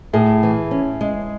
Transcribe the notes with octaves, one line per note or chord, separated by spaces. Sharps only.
A2 E4 G#4
E3
C#4
G#3